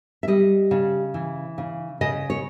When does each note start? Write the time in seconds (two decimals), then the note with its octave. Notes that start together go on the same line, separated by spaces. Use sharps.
0.23 E5
0.28 G3 D#5
0.71 C#3
1.14 E3
1.58 C#3
2.01 C#3 D#5
2.30 C#5